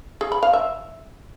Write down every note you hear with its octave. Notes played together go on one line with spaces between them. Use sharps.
G#4
B5
F5
E5